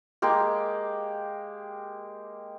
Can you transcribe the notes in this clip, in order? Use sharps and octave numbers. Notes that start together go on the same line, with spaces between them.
G#3 A#3 G4